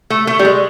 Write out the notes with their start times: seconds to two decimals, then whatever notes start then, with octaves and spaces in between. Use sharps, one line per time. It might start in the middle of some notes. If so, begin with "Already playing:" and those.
0.10 A3
0.27 A3
0.39 G3
0.45 G#3